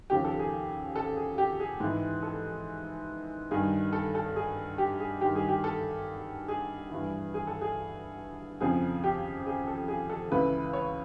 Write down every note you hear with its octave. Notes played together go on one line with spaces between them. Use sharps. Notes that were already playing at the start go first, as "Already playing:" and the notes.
D#2 C#3 F3 G4
A4
G#4
A4
G#4
G4
G#4
G#2 E3
A4
G2 D#3 G#4
A4
A4
G#4
G4
G#4
G2 D#3 G4
G#4
G4
A4
G#4
G2 E3
G#4
A4
G#4
F2 C#3 F3 G#4
G4
G#4
A4
G#4
A4
C#2 C#3 E3 B4
C#5